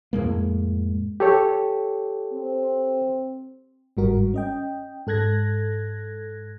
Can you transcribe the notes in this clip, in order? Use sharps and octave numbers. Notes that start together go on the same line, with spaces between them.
F2 A2 G#3 A#3
G4 A4 C#5
C4
G1 G#2 G3 F#4 A#4
C#4 D#5 G5
G#2 A4 F#6 G#6 A#6